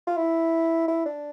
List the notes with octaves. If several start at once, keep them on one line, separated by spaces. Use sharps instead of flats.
F4
E4
E4
D4